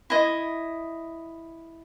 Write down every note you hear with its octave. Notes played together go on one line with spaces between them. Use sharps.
E4 D#5